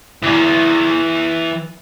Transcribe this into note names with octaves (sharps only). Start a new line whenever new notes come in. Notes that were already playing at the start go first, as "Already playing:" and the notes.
E3 D5